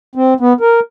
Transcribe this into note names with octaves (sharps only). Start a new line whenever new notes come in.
C4
B3
A#4